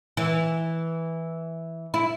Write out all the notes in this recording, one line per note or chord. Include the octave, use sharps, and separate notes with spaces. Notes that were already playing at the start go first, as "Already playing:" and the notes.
E3
E4